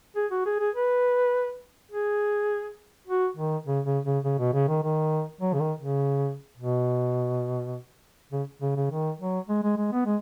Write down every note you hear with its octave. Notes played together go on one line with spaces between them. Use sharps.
G#4
F#4
G#4
G#4
B4
G#4
F#4
D#3
C#3
C#3
C#3
C#3
B2
C#3
D#3
D#3
F#3
C#3
D#3
C#3
B2
C#3
C#3
C#3
D#3
F#3
G#3
G#3
G#3
B3
G#3